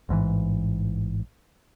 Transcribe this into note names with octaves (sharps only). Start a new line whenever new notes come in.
A1 G#2 C3 E3